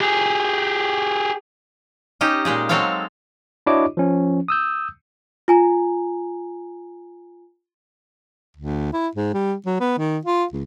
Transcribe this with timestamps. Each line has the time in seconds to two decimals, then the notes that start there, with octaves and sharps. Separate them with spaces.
0.01 G4 G#4
2.21 C#4 D#4 G4 C#5 D#5
2.45 A#2 G#3 G4 G#4
2.69 F#3 G#3 C4 A4 C#5 F5
3.67 D4 E4 F#4 C#5 D#5 D6
3.97 F3 C#4
4.48 D#6 E6 G6
5.48 F4 G#5 A#5
8.57 D2
8.93 E4
9.15 G#2
9.34 G3
9.66 F#3
9.80 B3
9.98 D#3
10.25 F4
10.53 C#2